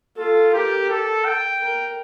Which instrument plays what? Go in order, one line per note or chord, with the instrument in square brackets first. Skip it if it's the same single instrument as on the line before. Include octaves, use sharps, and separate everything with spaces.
[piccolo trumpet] F4 [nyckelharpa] A4
[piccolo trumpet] G4 [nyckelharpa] A#4
[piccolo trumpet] A4
G5
[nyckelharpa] A#4